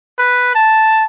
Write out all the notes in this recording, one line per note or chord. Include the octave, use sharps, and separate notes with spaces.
B4
A5